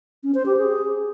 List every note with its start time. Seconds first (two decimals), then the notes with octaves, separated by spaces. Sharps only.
0.24 C#4
0.35 C5
0.46 G4
0.57 G#4